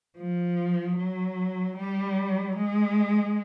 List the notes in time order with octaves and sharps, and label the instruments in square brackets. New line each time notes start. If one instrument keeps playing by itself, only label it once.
[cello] F3
F#3
G3
G#3